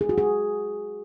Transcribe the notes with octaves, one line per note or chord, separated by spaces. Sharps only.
G#4
F#4
G#4